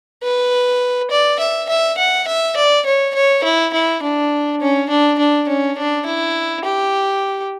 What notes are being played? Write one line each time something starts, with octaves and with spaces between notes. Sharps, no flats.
B4
D5
E5
E5
F#5
E5
D5
C#5
C#5
E4
E4
D4
C#4
D4
D4
C#4
D4
E4
G4